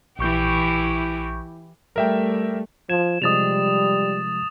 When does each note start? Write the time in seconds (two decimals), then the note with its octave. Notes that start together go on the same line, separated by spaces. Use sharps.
0.19 A#1 E3 E4 G4 C#6 G6
1.96 G3 A3 A#4 E5 G5
2.89 F3 G#6 E7
3.22 C3 F3 G3 G#3 D#6 A6 F7